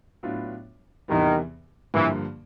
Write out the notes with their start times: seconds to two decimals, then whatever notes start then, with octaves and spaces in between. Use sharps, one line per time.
0.23 A2 F#3 B3 D4 F4
1.08 E2 C3 D#3 E3 G3 B3
1.93 G2 D3 E3 F3 A#3